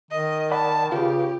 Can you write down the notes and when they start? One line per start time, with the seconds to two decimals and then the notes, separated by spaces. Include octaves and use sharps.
0.11 D#3 D#5
0.51 D5 F#5 A5 B5
0.92 C#3 F4 G4 B4